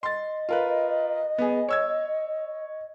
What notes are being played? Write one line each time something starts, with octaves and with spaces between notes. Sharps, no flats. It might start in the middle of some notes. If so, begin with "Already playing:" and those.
D#5 C6 A6
F4 A#4 B4
B3 G#4
C#5 E6 G#6